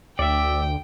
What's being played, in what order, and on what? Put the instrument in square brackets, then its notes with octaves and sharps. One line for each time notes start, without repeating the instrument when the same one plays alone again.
[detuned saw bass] D2 [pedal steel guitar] D5 E5 [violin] G5